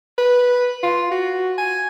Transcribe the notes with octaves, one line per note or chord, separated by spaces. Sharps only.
B4
F4
F#4
G#5